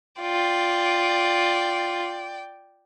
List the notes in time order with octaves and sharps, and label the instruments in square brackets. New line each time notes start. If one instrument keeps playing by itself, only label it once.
[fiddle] F4 [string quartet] D5 G5